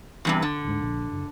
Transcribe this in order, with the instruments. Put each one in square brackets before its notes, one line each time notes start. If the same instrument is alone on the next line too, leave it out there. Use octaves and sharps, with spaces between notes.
[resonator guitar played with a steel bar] E2 G2 C3
D3
[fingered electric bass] D1 G#2
A#1
F#1